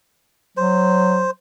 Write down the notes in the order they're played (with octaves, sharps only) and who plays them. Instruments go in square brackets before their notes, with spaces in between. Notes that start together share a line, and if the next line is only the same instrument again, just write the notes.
[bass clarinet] F#3 [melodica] C5